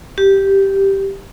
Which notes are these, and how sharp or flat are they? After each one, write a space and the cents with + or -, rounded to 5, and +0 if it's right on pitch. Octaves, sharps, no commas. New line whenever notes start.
G4 -5